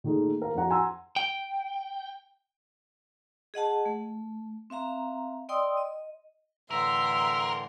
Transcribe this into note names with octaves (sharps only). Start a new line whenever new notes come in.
A#2 D#3 A3 D#4 G#4
A#4 F5
F2 D4 F#4 F#5 A#5
F#5 G#5 A#5 C6 E6
G5
G#4 D#5 F#5 A5
A3
C4 E5 F5 A#5
D5 D#5 G5 C6 D#6 E6
D#5
A2 D3 E3 A#4 E5 C6